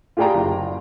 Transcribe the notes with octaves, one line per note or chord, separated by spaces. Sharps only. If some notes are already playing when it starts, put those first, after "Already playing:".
F4 G4 G#4 D5 G5 A#5
F#1